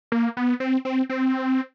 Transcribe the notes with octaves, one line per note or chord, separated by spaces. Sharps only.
A#3
B3
C4
C4
C4